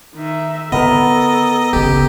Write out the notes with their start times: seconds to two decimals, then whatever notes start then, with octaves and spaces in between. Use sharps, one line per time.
0.15 D#3 E5
0.72 D3 B3 F4 A4 A#4 D#5 B5
1.73 G1 C#3 G4